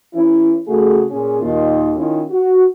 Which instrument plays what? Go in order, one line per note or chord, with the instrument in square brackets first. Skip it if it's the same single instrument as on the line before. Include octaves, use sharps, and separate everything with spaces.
[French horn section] E3 C#4 E4
C#3 A3 F#4 G#4
A#2 C#4 G#4
D#2 A#2 D#3 F4 D#5
D#3 C#4 E4 F4
F#4